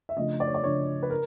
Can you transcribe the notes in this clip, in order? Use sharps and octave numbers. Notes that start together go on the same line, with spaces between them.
E5
C#3 F3 A3 D4 D#5
D5
C#5
D5
C#3 F3 A3 D4 C#5
B4
A#4